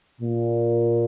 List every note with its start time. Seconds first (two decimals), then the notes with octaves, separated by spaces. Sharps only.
0.21 A#2